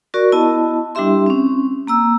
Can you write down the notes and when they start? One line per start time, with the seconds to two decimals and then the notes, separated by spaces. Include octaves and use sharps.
0.14 F#4 A#4 D5 C#6
0.32 B3 E4 D#5 A5
0.95 G3 D4 E4 G4 E5 C6
1.26 C4 C#4
1.87 A#3 A#5 E6